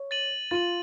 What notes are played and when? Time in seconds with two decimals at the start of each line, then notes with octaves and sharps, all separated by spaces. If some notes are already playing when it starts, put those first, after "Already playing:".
Already playing: C#5
0.11 A6 D#7 F#7
0.51 F4 A6 D#7 F#7